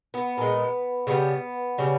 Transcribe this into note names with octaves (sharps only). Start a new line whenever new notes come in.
B3
A#2 G#3
C#3 G3 B3
C#3 G3